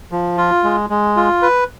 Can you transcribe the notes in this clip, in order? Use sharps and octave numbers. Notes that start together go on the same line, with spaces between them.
F3
F4
G#3
G#3
F4
B4